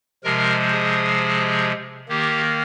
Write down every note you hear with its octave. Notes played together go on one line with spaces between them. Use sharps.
C3 F3 G#3 A#4
G#4
D#3 A#3 G4